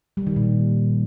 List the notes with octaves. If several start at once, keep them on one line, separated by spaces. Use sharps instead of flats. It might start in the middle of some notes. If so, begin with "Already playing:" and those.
G3
D#3
A#2